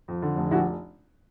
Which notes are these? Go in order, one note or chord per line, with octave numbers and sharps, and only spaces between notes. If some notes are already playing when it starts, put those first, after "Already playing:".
F2
D3
F1
A#1 E4 F#4